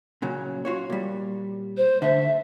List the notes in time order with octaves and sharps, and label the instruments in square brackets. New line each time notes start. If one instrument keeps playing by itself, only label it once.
[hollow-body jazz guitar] A#2 C#3 F#3
F4 F#4 C#5
A#2 G3
[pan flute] C5
[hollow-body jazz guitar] D3 A3 [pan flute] E5